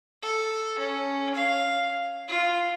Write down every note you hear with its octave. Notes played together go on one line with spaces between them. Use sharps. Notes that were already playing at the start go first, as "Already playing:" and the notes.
A4
C#4
F5
F4